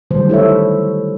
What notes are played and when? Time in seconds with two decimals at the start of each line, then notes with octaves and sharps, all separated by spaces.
0.11 D3 D#3 F#3 G3 A3 C5
0.29 E4 A4 C#5 E5